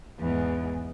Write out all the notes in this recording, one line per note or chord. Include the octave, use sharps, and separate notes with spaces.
E2 G#2